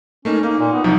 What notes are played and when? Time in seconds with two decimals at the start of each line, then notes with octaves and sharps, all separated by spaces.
0.25 A3 A#3 C#4 D#4
0.43 A#3 D#4
0.59 A#2
0.72 B3
0.84 C2 F3 F#3 D#4